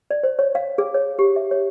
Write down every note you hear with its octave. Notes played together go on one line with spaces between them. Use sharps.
D5
C5
C#5
F5
G#4
C#5
G4
E5
C#5